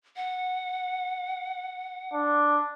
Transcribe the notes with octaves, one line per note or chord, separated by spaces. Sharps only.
F#5
D4